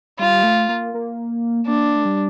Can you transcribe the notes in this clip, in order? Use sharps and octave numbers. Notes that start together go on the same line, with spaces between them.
G3 F4
A3
A#3
A#3
A#3 D4
A3
G3